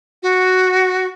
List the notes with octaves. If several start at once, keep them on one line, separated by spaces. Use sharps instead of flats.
F#4